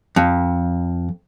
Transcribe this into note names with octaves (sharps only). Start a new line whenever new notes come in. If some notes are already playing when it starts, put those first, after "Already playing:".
F2